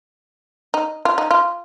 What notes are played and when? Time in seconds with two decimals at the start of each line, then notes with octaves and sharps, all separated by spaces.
0.74 D#4
1.05 F4
1.18 D#4
1.31 F4